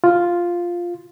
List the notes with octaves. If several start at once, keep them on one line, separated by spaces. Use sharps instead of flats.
F4